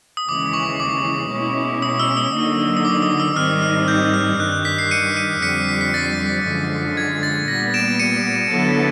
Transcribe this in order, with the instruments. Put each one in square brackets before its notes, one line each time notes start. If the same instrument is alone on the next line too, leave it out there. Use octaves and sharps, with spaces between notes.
[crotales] D#6
[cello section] D#2 C#3 E3 G#3 C#4 [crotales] D6
[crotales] C#6
D6
[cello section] B2 G#3 C#4 E4
[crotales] D#6
E6
D#6
[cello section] D3 F#3 A#3 D#4
[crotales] D#6
D6
D#6
E6
[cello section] G#2 D#3 G3 C4 D#4 [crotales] F6
[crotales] F6
G6
F6
[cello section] G2 D#3 G3 [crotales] F#6
[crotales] F#6
B6
C7
C#7 D#7
C#7 D#7
[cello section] F2 D3 G3 C4 [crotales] B6 C#7
[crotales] B6
B6
A6
[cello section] F#2 D3 F3 G#3
[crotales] G#6
A6
[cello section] A#2 G3 B3 [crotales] A#6
[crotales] D7 E7
C#7 D#7
[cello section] D3 F#3 B3 E4 A4